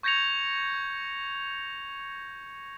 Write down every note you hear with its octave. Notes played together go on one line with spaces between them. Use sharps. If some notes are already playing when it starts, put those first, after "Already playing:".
C#6 G6 G#6 A#6 C#7 F7